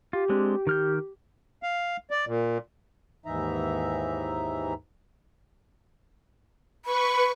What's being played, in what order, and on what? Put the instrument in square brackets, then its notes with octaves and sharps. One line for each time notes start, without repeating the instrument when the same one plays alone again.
[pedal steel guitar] F4 [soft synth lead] G4
[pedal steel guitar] G#3 C4 D4
D#3 F6 G6
[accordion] F5
D5
A#2
[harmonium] D#2 G#2 E3 D#4 E5 A#5
[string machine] B4 C#6 [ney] B5